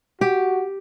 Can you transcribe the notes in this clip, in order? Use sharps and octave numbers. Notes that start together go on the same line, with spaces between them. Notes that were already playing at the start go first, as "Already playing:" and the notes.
F#4 G4